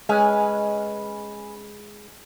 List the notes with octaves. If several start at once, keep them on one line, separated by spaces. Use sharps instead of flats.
G#3 C#4 B4 G#5